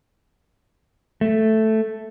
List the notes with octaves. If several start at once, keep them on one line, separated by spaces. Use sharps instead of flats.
A3